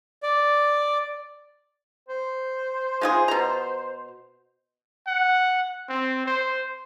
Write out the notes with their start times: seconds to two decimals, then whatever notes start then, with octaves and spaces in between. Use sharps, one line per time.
0.23 D5
2.08 C5
3.01 G#3 F4 G#4
3.28 B2 A#5
5.07 F#5
5.89 C4
6.26 C5